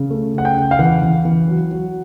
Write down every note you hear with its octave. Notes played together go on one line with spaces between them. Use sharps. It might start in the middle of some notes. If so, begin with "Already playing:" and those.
Already playing: C#3
A3
C#3 F#5
G5
C#3
F5
E3 F#5
E3
E3
F#3
F#3